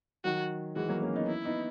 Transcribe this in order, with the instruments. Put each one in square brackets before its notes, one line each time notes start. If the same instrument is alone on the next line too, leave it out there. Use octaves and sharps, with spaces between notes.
[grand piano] D#3 F#3 [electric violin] F#4
[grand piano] E3 G#3 [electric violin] F#4
[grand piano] F#3 A#3
A#3 C#4
B3 D#4
[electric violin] E4
[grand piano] B3 D#4